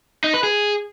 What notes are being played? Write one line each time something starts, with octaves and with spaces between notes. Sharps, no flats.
D#4
B4
G#4